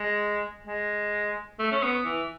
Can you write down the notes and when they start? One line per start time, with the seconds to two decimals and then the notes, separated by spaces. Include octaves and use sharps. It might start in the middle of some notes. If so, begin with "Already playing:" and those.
Already playing: G#3
0.67 G#3
1.59 A3
1.71 C#4
1.82 B3
2.05 E3